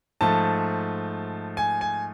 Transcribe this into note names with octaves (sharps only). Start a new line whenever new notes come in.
G#2 F3 A3 A5
G#5
G#5